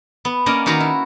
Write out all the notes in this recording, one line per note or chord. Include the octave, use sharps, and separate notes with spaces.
B3
A#3 C#4 D5 D#5
D#3 D#4 F#4 B4 F5 A#5
E4